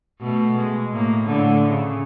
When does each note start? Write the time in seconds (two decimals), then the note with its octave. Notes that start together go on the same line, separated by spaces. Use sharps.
0.21 B2 A3
0.57 G#3
0.92 A2 A#3
1.25 A2 D3
1.69 C#3